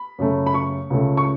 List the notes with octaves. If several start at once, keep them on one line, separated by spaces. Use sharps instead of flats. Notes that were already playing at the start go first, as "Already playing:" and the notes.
Already playing: B5
F#2 C#3 A3
B5
C#6
C#2 C#3 A3
C#6